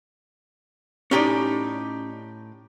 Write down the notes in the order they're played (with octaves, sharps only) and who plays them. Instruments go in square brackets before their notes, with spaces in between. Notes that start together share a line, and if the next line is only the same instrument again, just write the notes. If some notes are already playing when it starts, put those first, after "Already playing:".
[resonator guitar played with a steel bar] A2 G4 G#5 [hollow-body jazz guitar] C#4 D#4 D5